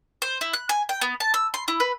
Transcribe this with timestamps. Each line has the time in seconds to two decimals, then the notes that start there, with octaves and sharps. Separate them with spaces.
0.22 C5
0.41 E4
0.53 F#6
0.69 G#5
0.89 G5
1.01 B3
1.20 A5
1.34 E6
1.54 C6
1.68 E4
1.80 B4